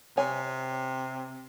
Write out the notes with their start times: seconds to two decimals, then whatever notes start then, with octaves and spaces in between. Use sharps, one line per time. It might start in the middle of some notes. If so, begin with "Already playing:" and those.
0.17 C3 C#5 G#5